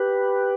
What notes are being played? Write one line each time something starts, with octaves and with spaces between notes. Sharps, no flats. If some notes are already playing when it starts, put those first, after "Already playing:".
Already playing: G4 B4